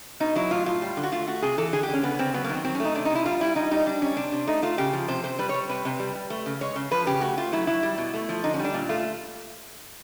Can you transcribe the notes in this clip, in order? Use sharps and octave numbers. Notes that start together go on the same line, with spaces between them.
B2 D#4
F#3 E4
A2 F4
A2 F4
G3
D3
F#4
A3 F4
A3 F#4
C3 G#4
E3 A4
D3 G#4
G4
D3
C#4
C#3 B3
C#3 C4
F#3 B3
A#3
D#3 C4
F#3 C4
C#4
A3 D#4
C3 D4
D#4
C3
E4
G3 F4
G3 E4
G3 D#4
G3 D#4
G3 D4
G3 C#4
C3 D4
C3
A3 D#4
A3 F4
C#3 G4
F3
C3 C5
C3 C5
G3 B4
C#5
G3
C3 B4
C3
G3
G3
A3
C#3
G#3 C#5
C#3
F3 B4
C#3 G4
A3 F#4
A3 F4
F#3 E4
F#3 E4
G3
B2
A3
F3
D3 D#4
C#4
G3
D4
A#2
A3 F4